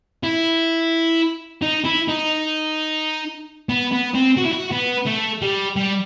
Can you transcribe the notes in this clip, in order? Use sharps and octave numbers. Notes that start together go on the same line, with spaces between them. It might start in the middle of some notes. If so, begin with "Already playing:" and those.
E4
D#4
E4
D#4
B3
B3
C4
F#4
E4
F#4
B3
A3
G3
G3